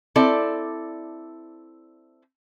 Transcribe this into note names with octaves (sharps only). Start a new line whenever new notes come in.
C4 E4 A4 D5